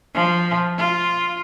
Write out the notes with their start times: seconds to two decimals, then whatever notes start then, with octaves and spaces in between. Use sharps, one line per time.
0.14 F3
0.78 F4